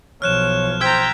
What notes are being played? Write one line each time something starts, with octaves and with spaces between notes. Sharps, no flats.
B1 F3 C#5 F6 F#6 E7
C5 G5 A#5 E6 G#6 B6